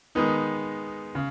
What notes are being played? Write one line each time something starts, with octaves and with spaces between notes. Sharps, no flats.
D#3 G#3 B3 D#4
C#3